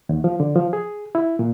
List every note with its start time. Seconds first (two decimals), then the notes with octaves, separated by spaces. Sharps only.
0.09 D#2
0.24 F3
0.40 D3
0.56 F3
0.73 G#4
1.15 E4
1.39 A#2